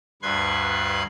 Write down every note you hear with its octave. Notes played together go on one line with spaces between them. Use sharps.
D2 G2 B4 C6 F#6 G#6